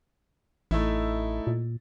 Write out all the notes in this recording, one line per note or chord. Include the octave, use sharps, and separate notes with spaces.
A1 A3 D#4 E4
A#2